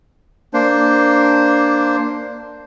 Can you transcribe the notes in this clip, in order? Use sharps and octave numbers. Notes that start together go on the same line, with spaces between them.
A#3 D4 C5